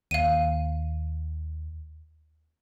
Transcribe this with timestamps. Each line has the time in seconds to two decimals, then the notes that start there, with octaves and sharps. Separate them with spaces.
0.11 D#2 F5 D#7